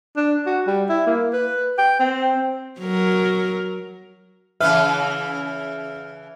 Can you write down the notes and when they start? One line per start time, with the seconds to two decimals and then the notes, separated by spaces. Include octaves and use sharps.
0.17 D4
0.46 F#4
0.67 G3
0.89 E4
1.07 A#3
1.33 B4
1.78 G5
2.00 C4
2.80 F#3 A#4
4.60 C#3 E3 B4 E5 F6